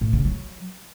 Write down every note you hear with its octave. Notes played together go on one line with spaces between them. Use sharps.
A2
C#3
F#3